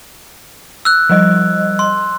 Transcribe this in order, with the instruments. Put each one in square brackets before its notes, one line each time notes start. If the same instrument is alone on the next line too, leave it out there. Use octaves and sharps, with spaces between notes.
[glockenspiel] E6 F#6
[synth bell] F3 G3 D#5
[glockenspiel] C6